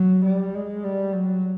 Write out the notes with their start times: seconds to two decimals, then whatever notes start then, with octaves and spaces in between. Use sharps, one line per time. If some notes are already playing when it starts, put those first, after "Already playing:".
Already playing: F#3
0.25 G3
0.54 G#3
0.84 G3
1.13 F#3